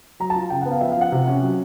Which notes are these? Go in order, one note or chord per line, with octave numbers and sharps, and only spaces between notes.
F#3 A#5
A5
F4
C#3 G5
F#5
B3
F5
F3 E5
F5
F3 F#5
C3
C#4
F#3